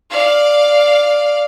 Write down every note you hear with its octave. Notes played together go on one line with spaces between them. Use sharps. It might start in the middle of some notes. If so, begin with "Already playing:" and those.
D5 F5